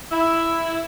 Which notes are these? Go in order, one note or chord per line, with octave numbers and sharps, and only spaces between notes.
E4